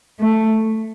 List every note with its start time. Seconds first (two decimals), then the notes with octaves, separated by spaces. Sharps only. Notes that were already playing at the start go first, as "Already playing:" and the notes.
0.20 A3